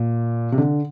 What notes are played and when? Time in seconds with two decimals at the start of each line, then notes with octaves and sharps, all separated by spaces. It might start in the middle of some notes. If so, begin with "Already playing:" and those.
Already playing: A#2
0.52 C3
0.58 D3